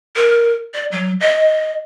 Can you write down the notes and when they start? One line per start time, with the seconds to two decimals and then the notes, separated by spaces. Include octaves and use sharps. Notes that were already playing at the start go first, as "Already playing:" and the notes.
0.16 A#4
0.74 D5
0.92 F#3
1.20 D#5